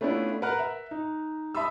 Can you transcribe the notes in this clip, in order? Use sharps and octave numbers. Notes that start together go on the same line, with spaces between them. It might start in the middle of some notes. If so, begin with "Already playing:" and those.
A3 B3 C#4 D4 E4 F4
A#4 B4 F#5 A#5 F6 F#6
E5
D#4
E5 A5 B5 C6 D#6 E6